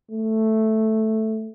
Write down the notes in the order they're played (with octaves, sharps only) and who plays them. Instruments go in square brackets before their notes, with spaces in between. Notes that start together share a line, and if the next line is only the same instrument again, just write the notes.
[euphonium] A3